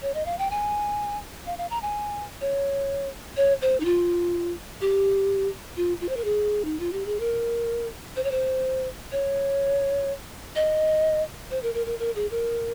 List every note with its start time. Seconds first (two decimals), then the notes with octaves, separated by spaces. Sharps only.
0.02 C#5
0.14 D#5
0.26 F5
0.39 G5
0.51 G#5
1.46 F5
1.58 F5
1.70 A#5
1.82 G#5
2.41 C#5
3.37 C#5
3.62 C5
3.80 D#4
3.85 F4
4.81 G4
5.77 F4
6.01 F4
6.09 C5
6.17 A#4
6.24 G#4
6.65 D#4
6.80 F4
6.93 G4
7.06 G#4
7.20 A#4
8.16 C5
8.24 C#5
8.31 C5
9.12 C#5
10.56 D#5
11.51 C5
11.63 A#4
11.74 A#4
11.86 A#4
12.00 A#4
12.15 G#4
12.31 A#4